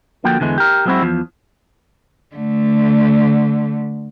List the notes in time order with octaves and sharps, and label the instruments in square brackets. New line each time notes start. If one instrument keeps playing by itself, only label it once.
[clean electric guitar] D3 F3 A#3 F#4 G5
E2 D3 E3 G#3
G4 A#4
F#3 G#3 B3 C4 E4 F#4
E2 F3
[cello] D3 A3